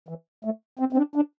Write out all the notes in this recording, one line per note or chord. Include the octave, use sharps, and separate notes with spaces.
E3
A3
C4
C4
D4
D4